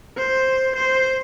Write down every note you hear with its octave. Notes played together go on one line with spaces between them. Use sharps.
C5
C5